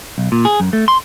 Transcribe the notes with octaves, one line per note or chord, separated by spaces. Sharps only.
B1
A#2
G#4
F#2
A3
C6